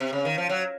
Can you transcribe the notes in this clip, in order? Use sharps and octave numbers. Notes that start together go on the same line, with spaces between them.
C3
C#3
D#3
F3
F#3